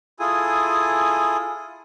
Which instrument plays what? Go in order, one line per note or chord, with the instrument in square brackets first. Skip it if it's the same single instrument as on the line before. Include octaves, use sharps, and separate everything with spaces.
[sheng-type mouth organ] E4 F4 G#4 A4 G#5 D#6